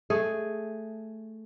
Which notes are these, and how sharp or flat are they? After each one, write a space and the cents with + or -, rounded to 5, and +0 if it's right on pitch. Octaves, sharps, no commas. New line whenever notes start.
A3 +0 G#4 +0